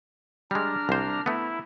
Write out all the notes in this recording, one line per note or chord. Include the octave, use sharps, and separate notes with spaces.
G3 G#3 D4 A#5 F6
C2 C5
A3 B3 E4